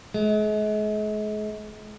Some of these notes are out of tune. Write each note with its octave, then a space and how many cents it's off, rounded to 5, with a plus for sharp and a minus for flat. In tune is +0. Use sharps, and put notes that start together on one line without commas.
G#3 +40